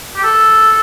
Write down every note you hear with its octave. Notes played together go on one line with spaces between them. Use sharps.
G4
A4